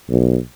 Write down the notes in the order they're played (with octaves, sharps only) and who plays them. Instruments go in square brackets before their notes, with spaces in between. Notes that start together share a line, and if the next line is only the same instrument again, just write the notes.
[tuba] B1